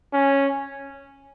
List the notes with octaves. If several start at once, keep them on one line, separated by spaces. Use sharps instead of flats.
C#4